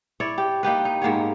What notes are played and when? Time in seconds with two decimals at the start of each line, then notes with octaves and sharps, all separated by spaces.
0.20 E4 C#5 D5
0.38 G4
0.63 A#3 D#4 G4 B4
0.85 D#4
1.02 G#2 A#3 B3 C#5